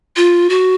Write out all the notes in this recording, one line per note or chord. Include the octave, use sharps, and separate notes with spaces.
F4
F#4